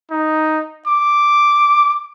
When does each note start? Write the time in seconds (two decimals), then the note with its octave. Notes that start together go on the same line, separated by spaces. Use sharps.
0.11 D#4
0.88 D6